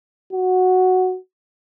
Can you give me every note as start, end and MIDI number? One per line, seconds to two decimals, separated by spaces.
0.33 1.17 66